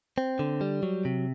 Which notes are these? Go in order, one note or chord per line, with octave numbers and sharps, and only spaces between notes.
C4
D3
G3
F#3
C3